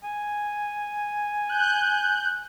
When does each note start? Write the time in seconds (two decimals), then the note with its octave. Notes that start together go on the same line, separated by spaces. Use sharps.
0.04 G#5
1.49 F#6 G6